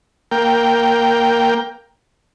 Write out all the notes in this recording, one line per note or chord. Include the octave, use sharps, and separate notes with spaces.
A#3 G5